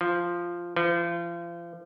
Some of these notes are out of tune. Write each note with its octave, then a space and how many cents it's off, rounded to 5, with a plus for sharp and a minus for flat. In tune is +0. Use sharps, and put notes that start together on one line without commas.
F3 -5
F3 -35